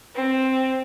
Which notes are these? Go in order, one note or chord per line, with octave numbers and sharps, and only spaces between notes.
C4